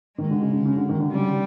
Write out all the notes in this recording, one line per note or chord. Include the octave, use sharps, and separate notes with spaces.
D#3 G#3
D3
C#3
C#3
C#3
D3
D#3
D3
C#3 G3